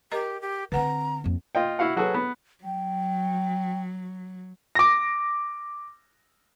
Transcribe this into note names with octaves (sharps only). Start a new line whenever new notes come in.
G4 A#4 D#5 A#5
G4
D3 C4 B4 F#5 A#5
F2 A#3
F4 D#5 G5
E4 F#4 F5 F#5
F#3 F#4 G#4 A4 B4
B3
F#3 G5
D6 A#6